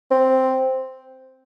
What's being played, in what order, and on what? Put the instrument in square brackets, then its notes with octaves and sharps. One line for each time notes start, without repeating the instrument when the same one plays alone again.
[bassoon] C4